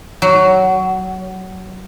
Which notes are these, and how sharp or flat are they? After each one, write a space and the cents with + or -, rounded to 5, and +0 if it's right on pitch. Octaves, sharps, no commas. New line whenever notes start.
F#3 +15